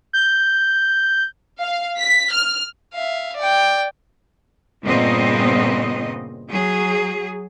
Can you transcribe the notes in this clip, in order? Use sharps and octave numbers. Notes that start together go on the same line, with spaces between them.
G6
F5
B6
F6
E5 F5
D5 G5
G2 A#2 C#3 B3 C4 D#5
F#3 G#4